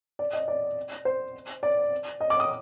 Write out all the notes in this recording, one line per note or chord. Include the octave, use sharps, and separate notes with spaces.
D5
D#5
D5
C5
D5
D#5
D6
D#6